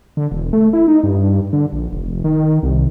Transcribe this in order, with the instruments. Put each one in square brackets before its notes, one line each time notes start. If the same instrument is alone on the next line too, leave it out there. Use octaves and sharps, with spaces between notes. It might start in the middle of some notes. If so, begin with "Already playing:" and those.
[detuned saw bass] D3
E1
A3
E4
D#4
G2
D3
A#1
F1
D#3
C2